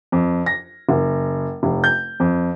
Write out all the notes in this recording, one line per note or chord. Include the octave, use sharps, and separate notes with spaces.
F2
A#6
F#1
F1
G6
F2